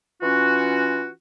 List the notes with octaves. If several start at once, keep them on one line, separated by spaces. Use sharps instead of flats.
E3 C#4 F4 F#4